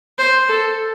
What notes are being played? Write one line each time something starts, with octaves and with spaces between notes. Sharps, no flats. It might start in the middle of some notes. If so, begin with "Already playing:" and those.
C5
A4